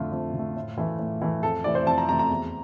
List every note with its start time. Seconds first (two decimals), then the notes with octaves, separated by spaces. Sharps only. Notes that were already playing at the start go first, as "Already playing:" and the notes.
Already playing: F2 D3 A3 F4
0.12 F2
0.34 D3
0.39 A3
0.56 A2
0.77 E3 A3
0.99 A2
1.22 E3 A3
1.43 F2 A4
1.64 C3 E3 A3 D5
1.75 C5
1.86 F2 A5
1.98 A#5
2.09 C3 E3 A3 A#5
2.19 A#5
2.30 E2